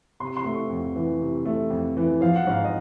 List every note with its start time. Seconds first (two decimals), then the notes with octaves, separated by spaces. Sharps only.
0.20 C3 C6
0.37 C6
0.44 A3
0.54 C#6
0.70 F2
0.96 E3
1.21 C3
1.45 A3
1.70 F2
1.97 E3
2.21 F3 F5
2.36 F#5
2.47 G#2 F5
2.64 D#5